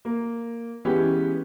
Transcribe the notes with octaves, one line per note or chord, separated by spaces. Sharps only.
A#3
E3 G#3 B3 C#4 G4